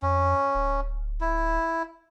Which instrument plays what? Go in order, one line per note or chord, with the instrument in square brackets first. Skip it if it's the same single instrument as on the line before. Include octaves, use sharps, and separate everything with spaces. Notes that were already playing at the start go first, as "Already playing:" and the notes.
[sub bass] F2 [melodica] C#4
[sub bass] D1
[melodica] E4